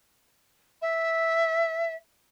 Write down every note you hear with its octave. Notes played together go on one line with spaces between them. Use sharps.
E5